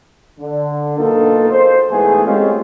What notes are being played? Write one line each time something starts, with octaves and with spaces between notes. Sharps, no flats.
D3
B1 A#3 D#4 F4 A4
C5
E2 G#2 A3 B3 G#4
G#3 A3 C4 C#4 F4 G4